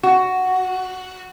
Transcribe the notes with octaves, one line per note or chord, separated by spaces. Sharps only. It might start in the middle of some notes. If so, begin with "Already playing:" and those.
F#4